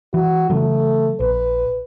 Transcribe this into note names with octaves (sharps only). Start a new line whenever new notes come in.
E3 F#4
C#3 E3 F#3 A3
A#1 B4